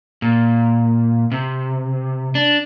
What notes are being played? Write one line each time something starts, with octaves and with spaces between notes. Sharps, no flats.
A#2
C3
D4